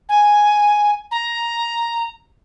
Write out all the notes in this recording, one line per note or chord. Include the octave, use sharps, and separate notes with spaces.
G#5
A#5